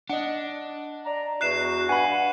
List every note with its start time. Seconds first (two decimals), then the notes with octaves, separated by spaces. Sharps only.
0.09 D4 D#5 F#5
1.06 D5 A#5
1.41 E2 F#4 F#6 C7 E7
1.89 G2 F#5 G#5 B5